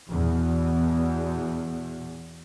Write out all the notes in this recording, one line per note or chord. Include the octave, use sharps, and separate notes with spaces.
E2 B2